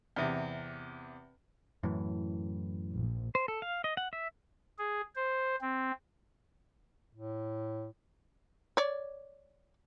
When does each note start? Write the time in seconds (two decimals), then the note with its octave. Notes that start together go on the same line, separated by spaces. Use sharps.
0.16 E2 C3
1.83 F#2 A2 E3
2.90 A#1
3.35 C5
3.48 A4
3.62 F5
3.84 D#5
3.97 F#5
4.13 E5
4.78 G#4
5.16 C5
5.61 C4
7.14 A2
8.77 C#5 D5